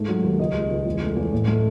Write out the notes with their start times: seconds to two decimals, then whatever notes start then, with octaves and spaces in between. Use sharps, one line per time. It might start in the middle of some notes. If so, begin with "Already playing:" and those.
Already playing: G#2 A3
0.08 F#3
0.24 D#2
0.39 C#2 D#5
0.55 G#3
0.70 C#2
0.86 E2
1.01 A3
1.17 E2
1.33 A2
1.48 A3